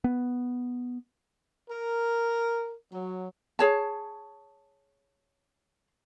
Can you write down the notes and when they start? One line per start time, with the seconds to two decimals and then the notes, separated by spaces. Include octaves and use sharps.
0.04 B3
1.70 A#4
2.93 F#3
3.59 G#4 C#5 A5